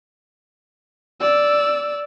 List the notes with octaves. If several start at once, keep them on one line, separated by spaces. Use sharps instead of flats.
D5 E6